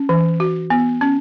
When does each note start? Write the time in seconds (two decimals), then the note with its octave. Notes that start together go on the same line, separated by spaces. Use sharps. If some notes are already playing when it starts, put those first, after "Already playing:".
Already playing: C#4
0.09 E3
0.40 F#4
0.70 B3
1.01 C#4